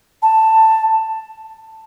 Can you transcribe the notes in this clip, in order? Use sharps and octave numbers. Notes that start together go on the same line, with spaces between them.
A5